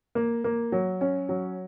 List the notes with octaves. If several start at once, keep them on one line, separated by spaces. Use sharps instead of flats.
A#3
A#3
F#3
C#4
F#3